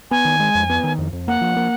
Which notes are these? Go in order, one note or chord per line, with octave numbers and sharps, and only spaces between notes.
B3 G#5
D#3
G#3
F2
B3
D#3
F2
F2
A#3 F#5
F3
A#3